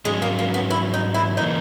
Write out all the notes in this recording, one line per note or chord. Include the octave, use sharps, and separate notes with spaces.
G#2 F#3 G#3 C#4
A#3
A#3
B3
E4
D#4
E4
C#3 E3 A#3 D#4